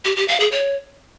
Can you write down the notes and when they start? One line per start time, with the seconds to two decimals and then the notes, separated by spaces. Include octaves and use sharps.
0.05 G4
0.16 G4
0.28 F5
0.40 G#4
0.52 C#5